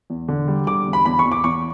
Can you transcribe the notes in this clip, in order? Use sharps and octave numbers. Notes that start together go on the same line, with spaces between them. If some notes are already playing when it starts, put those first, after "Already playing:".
E2
D3
G3
D3 D6
E2
B5
E2 B5
C#6
E2
D6
E2 C#6